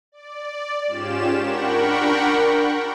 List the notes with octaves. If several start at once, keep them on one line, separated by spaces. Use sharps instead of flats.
D5
G#2 C#4 F4 G4 E7
D4 A#4 F#5 G5 B5 C#6